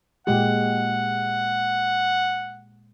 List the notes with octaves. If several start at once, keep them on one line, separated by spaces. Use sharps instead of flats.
A#2 G#3 G4 F#5